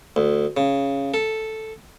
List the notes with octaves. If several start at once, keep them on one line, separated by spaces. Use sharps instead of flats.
D2
C#3
A4